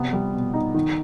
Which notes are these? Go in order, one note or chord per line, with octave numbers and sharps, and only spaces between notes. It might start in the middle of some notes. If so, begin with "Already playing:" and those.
Already playing: C3 B3
G3
B2
D#4
D#3